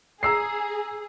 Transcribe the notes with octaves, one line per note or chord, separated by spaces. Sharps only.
G#4 A#5 E6 C7